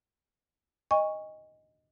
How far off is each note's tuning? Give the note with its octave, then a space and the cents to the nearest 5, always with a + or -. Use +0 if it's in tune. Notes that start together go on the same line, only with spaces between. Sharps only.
D#5 +0 G#5 -35 C#6 +0